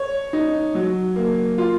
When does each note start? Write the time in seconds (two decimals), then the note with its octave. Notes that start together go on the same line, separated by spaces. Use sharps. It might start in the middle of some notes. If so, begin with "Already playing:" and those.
Already playing: C#5
0.33 D#4
0.75 F#3
1.16 A#3
1.58 F4